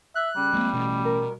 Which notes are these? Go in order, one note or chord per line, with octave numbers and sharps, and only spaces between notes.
E5 F#6
C#3 G3
F2 G#3 A#3
A1 B2
A#4